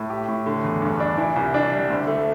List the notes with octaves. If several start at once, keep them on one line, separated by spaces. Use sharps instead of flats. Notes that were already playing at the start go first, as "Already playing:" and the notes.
Already playing: A2
G4
A2
D3
E2
G2
D4
E3
C2
D4
G3
D2
A3